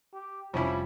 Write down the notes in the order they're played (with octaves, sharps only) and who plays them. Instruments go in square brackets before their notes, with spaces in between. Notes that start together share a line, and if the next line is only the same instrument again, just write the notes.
[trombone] G4
[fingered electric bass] F1 C3 [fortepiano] F3 C#4 E4 [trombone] G3 [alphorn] F4